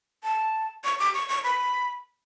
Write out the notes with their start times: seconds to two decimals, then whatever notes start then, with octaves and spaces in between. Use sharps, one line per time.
0.23 A5
0.84 C#6
0.99 D6
1.14 C#6
1.29 C#6
1.44 B5